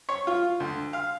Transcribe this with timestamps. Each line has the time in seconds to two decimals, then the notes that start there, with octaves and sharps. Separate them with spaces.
0.09 C#5
0.27 F4
0.60 D2
0.93 F5